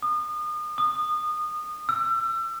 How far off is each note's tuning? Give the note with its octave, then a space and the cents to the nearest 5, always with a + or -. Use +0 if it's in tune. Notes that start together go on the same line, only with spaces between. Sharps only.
D#6 -35
D#6 -25
E6 +35